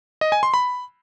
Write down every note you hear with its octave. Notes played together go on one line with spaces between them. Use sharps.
D#5
G#5
C6
B5